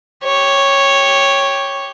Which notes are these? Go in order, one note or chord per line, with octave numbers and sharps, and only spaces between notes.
G4 C#5